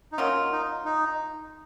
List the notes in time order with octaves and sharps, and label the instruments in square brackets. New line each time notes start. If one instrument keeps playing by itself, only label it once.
[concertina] D#4
[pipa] D#3 F#3 A#3 F4 [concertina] C#4
[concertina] D#4
D#4